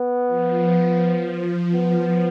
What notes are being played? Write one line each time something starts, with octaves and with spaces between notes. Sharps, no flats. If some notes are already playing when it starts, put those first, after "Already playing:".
Already playing: B3
F3
B3